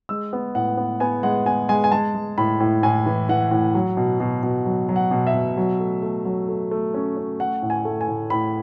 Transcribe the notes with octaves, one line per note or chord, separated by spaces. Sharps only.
G#3 E6
B3
A2 F#5
B3
B3 G#5
G#3 F#5
B3 G#5
G#3 G#5
G#5
G#3 A5
G#3
A2 B5
A2
A2 G#5
E3
E3 F#5
A2
F#3
B2
B2
B2
F#3
F#3
F#5
B2
E5
B2
F#3
A3
A3
F#3
A3
A3
C#4
C#4
A3 F#5
A2
G#5
A3
G#5
A2
A2 B5